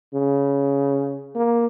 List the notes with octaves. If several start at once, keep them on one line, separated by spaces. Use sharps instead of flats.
C#3
A#3